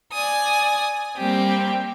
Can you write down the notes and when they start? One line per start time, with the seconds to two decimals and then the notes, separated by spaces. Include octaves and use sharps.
0.13 D5 G#5 D#6
1.17 G3 A#3 C4 G4